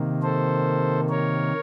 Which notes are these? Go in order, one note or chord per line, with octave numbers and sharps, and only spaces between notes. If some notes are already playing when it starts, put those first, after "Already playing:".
Already playing: C3 D#3 A#3
A4 C5
A#4 C#5